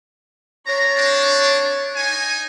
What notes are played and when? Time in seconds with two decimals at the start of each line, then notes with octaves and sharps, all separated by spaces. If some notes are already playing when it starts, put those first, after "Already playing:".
0.66 D4 C#5 A#5
0.97 G3 C4 D4
1.96 D#4 G#5